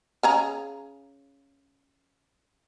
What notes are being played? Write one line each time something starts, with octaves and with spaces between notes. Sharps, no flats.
C#3 G#4 A#5